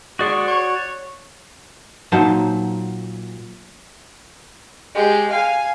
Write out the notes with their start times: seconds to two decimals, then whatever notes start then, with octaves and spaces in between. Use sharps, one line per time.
0.19 G#3 F#4 D5 C#6
0.48 C#5
2.12 A#2 F#3 D#4 C5 F#5 A5
4.95 G#3 G4
5.30 F5 G#5